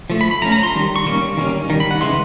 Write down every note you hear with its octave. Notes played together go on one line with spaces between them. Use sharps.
F3 A3
B5
B5
F3 A3 C#4 A#5
A#5
C6
D#3 G3
C#6
D#3 G3 A#3 C#4
D#3 G3 A#3 C#4
D#3 G3
B5
F#5
C#3 E3 G#3 C6